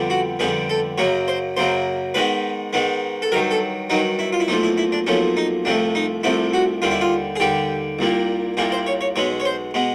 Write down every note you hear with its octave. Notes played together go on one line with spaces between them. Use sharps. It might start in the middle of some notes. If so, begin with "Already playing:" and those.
Already playing: F2 D3 G3 B3
F#4
F2 D3 G3 B3 G#4
A4
F#2 C#3 F#3 A#3 C#5
C5
F#2 C#3 F#3 A#3 C5
G#2 D#3 G#3 B3 B4
G#2 D#3 G#3 B3
A4
G2 D#3 F#3 A#4
A4
G2 D#3 F#3 D#4
E4
F4
E4
B1 A#2 F3 A3 D#4
E4
E4
D4
B1 A#2 F3 A3 C#4
D#4
C2 C3 F3 A3 D4
D#4
C2 C3 F3 A3 E4
F#4
D#2 D3 G3 F4
E4
F4
G#4
D#2 D3 G3 G4
C2 A#2 G3 A#3
C2 A#2 G3 A#3 G#4
C5
C#5
C#5
B1 B2 G#3 B3 C#5
C#5
C5
B2 G#3 B3